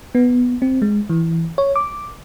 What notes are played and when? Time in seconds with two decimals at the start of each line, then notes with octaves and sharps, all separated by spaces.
0.15 B3
0.62 C4
0.82 G#3
1.09 E3
1.58 C#5
1.76 D6